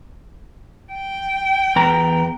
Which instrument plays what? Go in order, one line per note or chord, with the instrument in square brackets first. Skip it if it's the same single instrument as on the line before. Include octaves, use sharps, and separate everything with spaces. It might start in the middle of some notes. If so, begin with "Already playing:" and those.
[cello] G5
[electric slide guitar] E2 B4 A#5